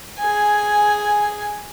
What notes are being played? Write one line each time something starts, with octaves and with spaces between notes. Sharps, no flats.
G#4 G#5